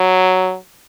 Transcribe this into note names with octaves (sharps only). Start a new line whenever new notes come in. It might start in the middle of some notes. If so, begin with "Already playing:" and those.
Already playing: F#3